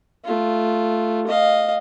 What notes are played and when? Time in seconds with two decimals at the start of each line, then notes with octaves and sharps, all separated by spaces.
0.24 A3 F4
1.27 D#5 F5